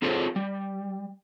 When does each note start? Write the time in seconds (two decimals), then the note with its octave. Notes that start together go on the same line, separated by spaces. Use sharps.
0.02 C4 F4 G#4 A4 C5 C#5
0.36 G3